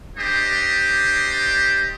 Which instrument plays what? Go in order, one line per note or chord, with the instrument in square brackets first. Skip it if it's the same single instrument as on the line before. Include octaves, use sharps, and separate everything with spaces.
[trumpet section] D4 G4 C5 D5 D#5